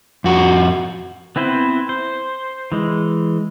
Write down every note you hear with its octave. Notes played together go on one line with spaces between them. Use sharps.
F2 F#4
B3 C4 E4 B4 C5
C5
E3 G#3